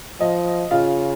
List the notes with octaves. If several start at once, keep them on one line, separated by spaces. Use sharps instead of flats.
F3 D#5
C#3 F4 F5